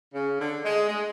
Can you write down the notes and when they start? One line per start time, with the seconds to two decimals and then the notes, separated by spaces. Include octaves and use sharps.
0.14 C#3
0.41 D3
0.65 G#3
0.89 G#3